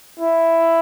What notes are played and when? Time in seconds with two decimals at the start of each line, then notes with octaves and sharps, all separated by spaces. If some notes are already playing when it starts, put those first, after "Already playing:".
0.19 E4